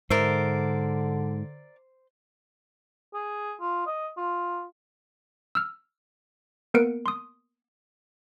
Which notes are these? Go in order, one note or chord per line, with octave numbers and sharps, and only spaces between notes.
G#2 D3 A#4 C5 D5 E5
G#4
F4
D#5
F4
E6 F6
A#3 B3 A#4 B4 C#7 D7
C6 D#6